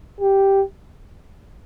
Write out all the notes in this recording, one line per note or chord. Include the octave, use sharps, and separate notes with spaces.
G4